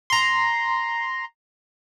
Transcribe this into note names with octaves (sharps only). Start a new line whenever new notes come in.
A#5 C6